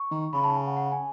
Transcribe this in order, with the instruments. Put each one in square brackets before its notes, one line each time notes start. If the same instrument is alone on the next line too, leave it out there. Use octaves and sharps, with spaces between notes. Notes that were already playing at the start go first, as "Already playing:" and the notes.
Already playing: [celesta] C#6
[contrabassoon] D#3
[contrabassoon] C#3 [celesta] B5
[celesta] A5
G#5
F#5
F#5
G#5